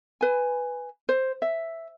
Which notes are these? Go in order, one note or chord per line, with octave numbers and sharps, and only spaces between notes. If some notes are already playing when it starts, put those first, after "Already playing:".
B4 G#5
C5
E5